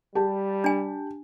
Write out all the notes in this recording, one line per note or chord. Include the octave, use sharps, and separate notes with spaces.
G3 G4 A5
D4 G#5